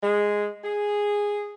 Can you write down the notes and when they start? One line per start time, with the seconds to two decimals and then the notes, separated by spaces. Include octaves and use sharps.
0.02 G#3
0.63 G#4